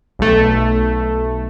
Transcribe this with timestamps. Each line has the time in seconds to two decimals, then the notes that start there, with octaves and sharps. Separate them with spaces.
0.19 B1 A3